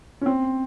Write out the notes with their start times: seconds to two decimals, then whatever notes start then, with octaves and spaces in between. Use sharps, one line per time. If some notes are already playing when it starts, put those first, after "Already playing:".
0.21 C#4
0.26 C4